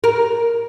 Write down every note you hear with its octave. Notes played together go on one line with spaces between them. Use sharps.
A#4